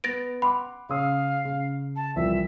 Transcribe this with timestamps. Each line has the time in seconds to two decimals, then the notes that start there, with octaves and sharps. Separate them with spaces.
0.04 B3 A6 A#6 D7
0.42 F#5 B5 C6 D6
0.89 C#3 C#5 F5 D#6
1.45 C#3
1.96 A5
2.16 C2 E3 F3 E5